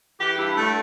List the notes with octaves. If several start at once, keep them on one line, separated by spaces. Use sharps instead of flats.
E3 G4
G2 E4
G2 A3